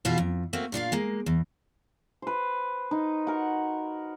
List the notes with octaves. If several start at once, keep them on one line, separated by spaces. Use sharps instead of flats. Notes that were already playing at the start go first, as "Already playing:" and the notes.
E2 B2 E4 F4 F5
F2
A3 A#3 C4 F#4
A#2 D4 F4 F5
G#3 A#3
E2
B4 C5
D#4
F#4 A#4 F#5